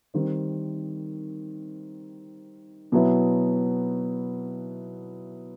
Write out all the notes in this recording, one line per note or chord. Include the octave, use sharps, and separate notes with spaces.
D#3 G3 C4
B2 F#3 B3 E4